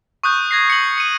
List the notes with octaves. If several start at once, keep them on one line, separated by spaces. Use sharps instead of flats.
C#6 D#6 F#6 G6
G#6 A#6 C7
C#7 F#7
C#7 D#7